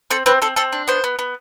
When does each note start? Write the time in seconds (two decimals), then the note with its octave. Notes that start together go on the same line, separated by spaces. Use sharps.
0.11 C4 A4
0.26 C4 B4
0.42 C4 A4
0.56 C4 A4
0.72 D4
0.88 B3 C5
1.04 B3
1.19 B3